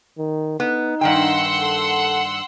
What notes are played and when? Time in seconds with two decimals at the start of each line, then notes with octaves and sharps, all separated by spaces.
0.18 D#3
0.60 B3 D#4
1.01 G2 D#3 F#5 G5 C6 E6
1.61 A4